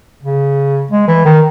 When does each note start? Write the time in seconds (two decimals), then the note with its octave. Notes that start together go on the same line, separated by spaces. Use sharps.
0.23 C#3
0.91 G#3
1.08 E3
1.25 D#3